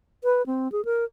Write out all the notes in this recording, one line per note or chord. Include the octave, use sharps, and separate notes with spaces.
B4
C4
G#4
A#4